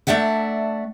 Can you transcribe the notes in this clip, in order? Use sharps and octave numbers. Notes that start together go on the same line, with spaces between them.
A3 D4 D5 E5 F#5